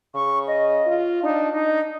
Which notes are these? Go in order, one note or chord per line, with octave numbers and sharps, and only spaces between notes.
C#3 C#6
D#5
F4
D4 D#4
D4 D#4